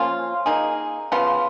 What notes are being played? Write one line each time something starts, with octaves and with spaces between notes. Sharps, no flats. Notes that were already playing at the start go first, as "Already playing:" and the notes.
Already playing: F3 A#3 C#4 F4
A#3 D#4 G#4
C#3 F3 B3 F4